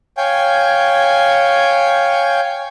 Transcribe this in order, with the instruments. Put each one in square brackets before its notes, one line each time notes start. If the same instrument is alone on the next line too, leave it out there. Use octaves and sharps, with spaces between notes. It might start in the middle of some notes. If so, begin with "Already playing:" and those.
[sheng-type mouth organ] C#5 F5 G5 G#5